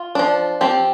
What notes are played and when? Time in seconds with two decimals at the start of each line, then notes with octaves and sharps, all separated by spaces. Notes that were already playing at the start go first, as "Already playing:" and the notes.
Already playing: F4
0.15 F3 D4
0.61 F3 C4 G4